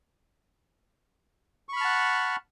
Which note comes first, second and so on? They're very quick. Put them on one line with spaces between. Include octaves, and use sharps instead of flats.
C#6 B5 F6 A5 F#5